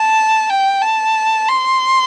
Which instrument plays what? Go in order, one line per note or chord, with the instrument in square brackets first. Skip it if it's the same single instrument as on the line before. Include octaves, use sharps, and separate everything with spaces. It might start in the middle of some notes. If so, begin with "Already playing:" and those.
Already playing: [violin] A5
G5
A5
C6